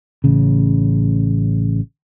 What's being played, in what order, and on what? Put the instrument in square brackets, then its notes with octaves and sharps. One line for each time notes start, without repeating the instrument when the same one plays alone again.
[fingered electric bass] A1 C#3